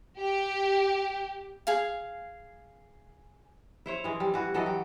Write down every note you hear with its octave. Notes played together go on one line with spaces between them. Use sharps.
G4
G#4 F5
E4 C5 C#5
E3 G#3
G3
E3 F#4
E3 F#3 A4 D#5
G4